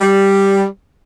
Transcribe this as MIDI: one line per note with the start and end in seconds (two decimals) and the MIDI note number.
0.01 0.63 55